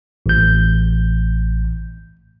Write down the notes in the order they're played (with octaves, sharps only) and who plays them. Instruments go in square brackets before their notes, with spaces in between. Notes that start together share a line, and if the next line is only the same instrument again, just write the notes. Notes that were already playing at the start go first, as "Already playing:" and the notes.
[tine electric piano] A1 G6